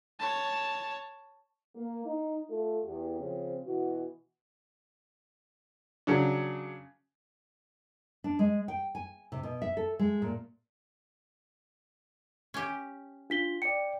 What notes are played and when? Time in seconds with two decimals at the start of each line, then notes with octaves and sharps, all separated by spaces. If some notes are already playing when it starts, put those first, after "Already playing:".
0.20 C#5 A5
1.75 A#3
2.06 D#4
2.49 A3 F4 A4
2.85 E2 G4
3.20 C#3 F3 C4
3.66 B2 E3 F#4
6.07 C#3 F#3 D4
8.24 D4
8.39 G#3
8.68 G5
8.95 G#5
9.32 C3
9.43 B2
9.62 E5
9.77 A4
9.99 G#3
10.22 A#2
12.54 C#4 G4
13.30 D4 F4 B6 G7
13.62 D5 G5 C#7